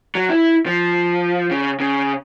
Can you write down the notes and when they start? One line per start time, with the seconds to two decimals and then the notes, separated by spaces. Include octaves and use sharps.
0.15 F#3
0.30 E4
0.66 F3
1.51 C#3
1.80 C#3